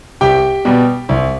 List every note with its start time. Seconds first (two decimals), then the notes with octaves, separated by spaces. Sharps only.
0.21 C2 G4 G5
0.65 B2 G3
1.09 C2